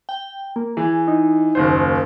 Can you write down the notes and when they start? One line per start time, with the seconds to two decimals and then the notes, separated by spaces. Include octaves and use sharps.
0.09 G5
0.56 A#3
0.77 E3 G#4
1.08 D#4
1.55 F#1 D#2 C5